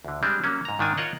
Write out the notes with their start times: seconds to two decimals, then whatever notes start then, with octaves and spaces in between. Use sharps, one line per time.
0.05 D2 D3
0.23 G3 G#3 C4 D4
0.44 F#3 A#3 C#4
0.65 G#2 A#5
0.79 G#2 D#3 D4 G#5
0.97 F4 A#4 C#5 D#5 F#5